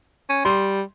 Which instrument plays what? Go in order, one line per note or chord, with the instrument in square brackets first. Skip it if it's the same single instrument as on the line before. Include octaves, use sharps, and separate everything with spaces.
[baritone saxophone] C#4
[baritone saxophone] G3 [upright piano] C6